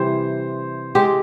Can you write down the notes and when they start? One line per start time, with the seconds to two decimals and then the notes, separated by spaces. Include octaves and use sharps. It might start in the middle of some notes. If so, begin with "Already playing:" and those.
Already playing: C3 E3 G3 C5
0.95 G#3 C4 G4